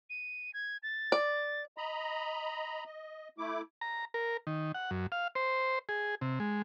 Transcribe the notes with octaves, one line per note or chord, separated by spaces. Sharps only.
D#7
G#6
A6
D5
D#5 A#5 B5
D#5
A3 E4 D6
A#5
A#4
D#3
F#5
F#2
F5
C5
G#4
C3
G#3